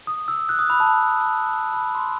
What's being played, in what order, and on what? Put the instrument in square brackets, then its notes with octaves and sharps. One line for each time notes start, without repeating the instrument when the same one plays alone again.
[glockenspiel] D#6
E6
F#6
D#6
B5
A5
B5
C6